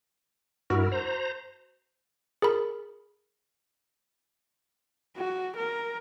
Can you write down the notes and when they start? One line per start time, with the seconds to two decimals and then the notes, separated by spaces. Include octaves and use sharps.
0.70 G2 E4 F#4 A#4
0.92 C5 A#5
2.42 G#4 A#4 B5
5.17 F#4
5.56 A#4